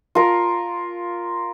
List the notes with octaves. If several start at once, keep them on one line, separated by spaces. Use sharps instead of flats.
F4 A#4